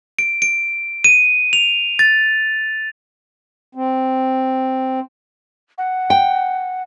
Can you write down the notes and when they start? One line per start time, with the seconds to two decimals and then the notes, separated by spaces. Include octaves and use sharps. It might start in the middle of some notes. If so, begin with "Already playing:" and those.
0.19 D7
0.42 D7
1.04 D#7
1.53 F7
1.99 A6
3.75 C4
5.78 F#5
6.10 G5